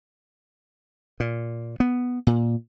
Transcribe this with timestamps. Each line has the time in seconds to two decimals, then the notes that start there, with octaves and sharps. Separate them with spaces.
1.20 A#2
1.80 B3
2.27 A#2